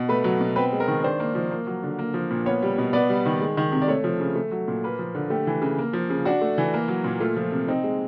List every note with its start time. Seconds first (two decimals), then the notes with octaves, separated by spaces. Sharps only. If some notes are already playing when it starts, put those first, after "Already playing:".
Already playing: B2
0.09 A3 B4
0.24 F#3
0.41 B2
0.56 C4 B4
0.72 G#3
0.80 A#4
0.88 D#3
1.03 D4 C5
1.20 A#3
1.35 F3
1.51 A#3
1.67 F#3
1.83 D3
1.99 A#3
2.14 F3
2.31 A#2
2.46 B3 C#5
2.62 G3
2.78 B2
2.93 B3 D5
3.10 G3
3.26 D#3
3.41 G#3
3.57 D#3
3.72 C3
3.82 D5
3.88 A3 C#5
4.04 F3
4.20 C#3
4.36 A3
4.51 F#3
4.68 A#2
4.84 A#3 B4
4.99 F3
5.15 D3
5.30 A3 G4
5.47 E3
5.62 C#3
5.78 A#3
5.93 F3
6.10 C#3
6.25 D4 F#4
6.42 A3
6.58 E3
6.74 A#3
6.88 F#3
7.04 A#2
7.20 A3 F4
7.36 F3
7.52 C3
7.68 C4 D#4
7.84 G#3